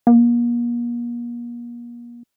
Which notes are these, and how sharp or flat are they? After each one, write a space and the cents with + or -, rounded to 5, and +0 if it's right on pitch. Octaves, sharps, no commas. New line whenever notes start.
A#3 +40